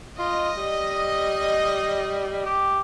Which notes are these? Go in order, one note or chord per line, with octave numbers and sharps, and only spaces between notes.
F4 D#5
G3
G4